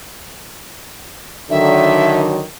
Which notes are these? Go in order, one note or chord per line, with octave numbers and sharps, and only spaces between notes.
D3 D#3 F#3 E5